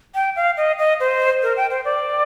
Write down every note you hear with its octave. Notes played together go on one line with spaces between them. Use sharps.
G5
F5
D#5
D#5
C5
A#4
G5
C5
D5